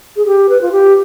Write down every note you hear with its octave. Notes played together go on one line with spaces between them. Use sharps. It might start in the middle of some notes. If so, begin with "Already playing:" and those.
G#4
G4
B4
F4
G4